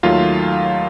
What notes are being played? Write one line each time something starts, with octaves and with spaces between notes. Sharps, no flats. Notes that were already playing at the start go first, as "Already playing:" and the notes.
D#2 D#3 F#3 A3 F4 F5